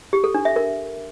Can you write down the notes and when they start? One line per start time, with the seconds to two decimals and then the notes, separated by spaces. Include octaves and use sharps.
0.13 G4
0.24 A4
0.34 D4
0.45 E5
0.56 A#4